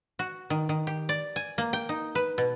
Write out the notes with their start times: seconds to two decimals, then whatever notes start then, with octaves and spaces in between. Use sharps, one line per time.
0.19 F#4
0.50 D#3
0.69 D#3
0.87 G4
1.09 D5
1.36 G#5
1.58 A#3
1.73 G5
1.89 D#4
2.15 B4
2.38 B2